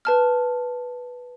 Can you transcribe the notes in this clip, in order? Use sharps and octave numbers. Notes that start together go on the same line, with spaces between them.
B4 A5 F6